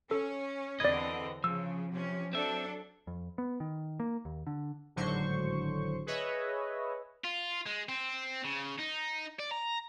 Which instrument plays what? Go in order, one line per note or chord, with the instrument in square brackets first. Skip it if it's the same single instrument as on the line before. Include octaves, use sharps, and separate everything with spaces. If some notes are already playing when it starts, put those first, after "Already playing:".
[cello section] C#4 [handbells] A4
[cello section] E2 D3 C4 [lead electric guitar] B4 D#5 [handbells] D5 G#6
[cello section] C#3 [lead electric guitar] F3 [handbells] E6
[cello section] C3 C#4
[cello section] F#3 D4 A4 [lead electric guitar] C4 E5
[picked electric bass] F2
B3
D#3
A#3
D#2
D3
[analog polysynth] G#1 A2 D3 F#3 C5 C#6
G#4 B4 C#5 D#5 E5
[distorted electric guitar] F4
G#3
C4
C#3
D#4
D5
A#5